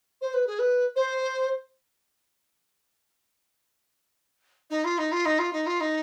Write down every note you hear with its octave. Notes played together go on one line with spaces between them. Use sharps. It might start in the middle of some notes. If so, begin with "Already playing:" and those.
C5
B4
G#4
B4
C5
D#4
F4
D#4
F4
D#4
F4
D#4
F4
D#4